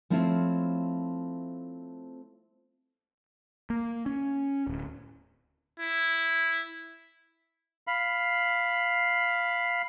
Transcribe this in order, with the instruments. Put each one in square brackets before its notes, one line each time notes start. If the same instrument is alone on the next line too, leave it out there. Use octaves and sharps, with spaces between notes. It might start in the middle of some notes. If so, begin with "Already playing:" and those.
[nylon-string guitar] F3 A3 C4 E4 F4 C#5
[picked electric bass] A#3
C#4
D1
[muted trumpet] E4
[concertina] F5 B5